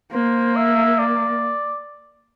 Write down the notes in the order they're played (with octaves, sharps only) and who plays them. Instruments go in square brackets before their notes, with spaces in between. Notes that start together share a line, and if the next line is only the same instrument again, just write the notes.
[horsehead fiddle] A#3 [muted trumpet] C5
[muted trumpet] E5
D5